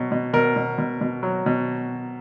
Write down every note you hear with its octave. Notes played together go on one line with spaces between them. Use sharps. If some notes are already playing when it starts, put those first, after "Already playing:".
Already playing: B2 F#3
B2
B2 A#4
B2
B2
B2
F#3
B2